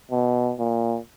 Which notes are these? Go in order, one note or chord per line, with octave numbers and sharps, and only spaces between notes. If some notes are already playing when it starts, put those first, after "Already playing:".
B2
A#2